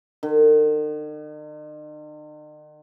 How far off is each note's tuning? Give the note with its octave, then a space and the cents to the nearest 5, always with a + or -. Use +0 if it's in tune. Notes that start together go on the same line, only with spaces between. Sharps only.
D#3 -45